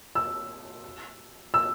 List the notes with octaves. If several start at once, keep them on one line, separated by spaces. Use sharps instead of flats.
E6
E6